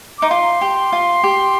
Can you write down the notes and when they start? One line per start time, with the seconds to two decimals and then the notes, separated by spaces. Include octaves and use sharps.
0.19 D#4 D6
0.30 F4 C6
0.61 G4
0.92 F4
1.24 G4